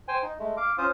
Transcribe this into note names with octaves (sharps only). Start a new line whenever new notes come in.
C5 G5 G#5
D#4
G#3 A3
F5 D6
C#4 F4 C5 F5 D#6